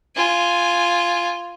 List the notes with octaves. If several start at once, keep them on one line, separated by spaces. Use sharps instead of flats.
F4 G#5